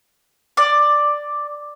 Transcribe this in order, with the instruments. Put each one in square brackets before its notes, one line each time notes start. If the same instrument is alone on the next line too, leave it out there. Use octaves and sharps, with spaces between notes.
[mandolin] D5